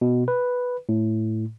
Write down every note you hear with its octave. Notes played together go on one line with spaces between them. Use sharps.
B2
B4
A2